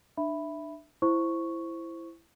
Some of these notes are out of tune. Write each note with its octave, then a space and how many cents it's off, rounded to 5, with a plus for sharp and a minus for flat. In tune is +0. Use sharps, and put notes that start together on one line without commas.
D4 +30 E5 +0 B5 +0
E4 +15 C5 +0 C#6 +0